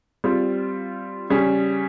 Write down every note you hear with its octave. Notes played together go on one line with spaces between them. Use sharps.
G3 C4 F4
C#3 G3 C#4